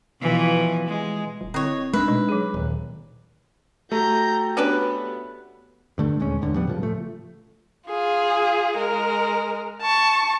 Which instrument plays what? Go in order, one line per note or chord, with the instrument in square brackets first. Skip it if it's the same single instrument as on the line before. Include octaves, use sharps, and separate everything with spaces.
[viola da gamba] B2 E3 F3
G#3
[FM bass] D#1
[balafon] D3 C4 E4 [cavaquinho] C#5 D#5
[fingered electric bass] G#3 D4 [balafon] A3 D#4 [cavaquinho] B4 E5
[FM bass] B2 [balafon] D#4
[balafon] F#3 G#4
[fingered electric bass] D#1
[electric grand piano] A3 [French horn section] F#4 G4 [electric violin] A#5 G6
[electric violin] B3 [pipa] C#4 D4 B4
[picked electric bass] G2 D3 A3
D#1 G#3 C#4
E2 A2 D3
F3 G3 B3
A2 C#3 F3
F3 A3
[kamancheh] F4 G#4
G#3 A#4
A5 C#6